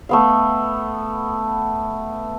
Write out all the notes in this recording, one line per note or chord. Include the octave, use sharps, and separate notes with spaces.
A3 B3 F5